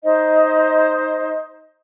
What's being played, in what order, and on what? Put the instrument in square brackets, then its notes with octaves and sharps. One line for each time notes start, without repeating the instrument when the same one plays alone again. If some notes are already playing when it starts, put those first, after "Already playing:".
[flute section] D#4 C5 D#5